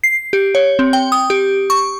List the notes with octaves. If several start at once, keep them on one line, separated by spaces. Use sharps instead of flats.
C7
G4
C#5
C4
G5
D#6
G4
C#6